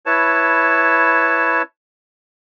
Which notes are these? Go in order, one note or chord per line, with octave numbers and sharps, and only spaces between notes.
E4 B4 C#5 A5